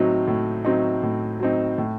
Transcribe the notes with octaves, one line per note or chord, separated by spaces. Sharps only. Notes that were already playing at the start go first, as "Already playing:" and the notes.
Already playing: A2 F#3 C4 D#4
A2
F#3 C4 D#4
A2
F#3 C4 D#4
A2